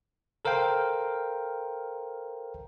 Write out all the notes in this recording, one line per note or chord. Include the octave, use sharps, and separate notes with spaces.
A4 A#4 C5 F5 G5